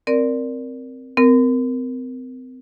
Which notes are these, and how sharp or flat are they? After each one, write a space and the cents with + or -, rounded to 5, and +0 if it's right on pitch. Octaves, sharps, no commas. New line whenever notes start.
C4 +0 A#4 +0 D5 +0
C4 -35 A#4 +0